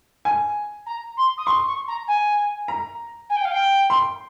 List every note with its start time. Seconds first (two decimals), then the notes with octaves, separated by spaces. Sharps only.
0.25 G#5
0.86 A#5
1.17 C6
1.38 D#6
1.46 C6 C#6
1.68 C#6
1.88 A#5
2.08 G#5
2.68 A#5
3.30 G#5
3.36 G5
3.45 F5
3.51 G5
3.90 C6